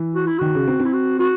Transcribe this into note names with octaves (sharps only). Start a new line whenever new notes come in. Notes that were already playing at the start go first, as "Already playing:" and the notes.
Already playing: E3
F#4
E4
D#3 F#4
C#3
C4
C4
E4
F#4
F#4